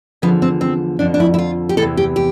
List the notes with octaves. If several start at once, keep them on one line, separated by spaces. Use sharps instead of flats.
E2 D3 F3 B3
C4
C4
F2 D3 F3 D4
D4
E4
E4
F4
G4
E2 C3 E3 A4
G4
G4